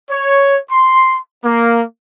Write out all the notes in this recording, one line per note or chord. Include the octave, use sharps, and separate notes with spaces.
C#5
C6
A#3